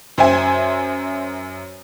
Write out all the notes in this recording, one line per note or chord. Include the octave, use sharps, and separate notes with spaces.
F#2 C5 E5 G#5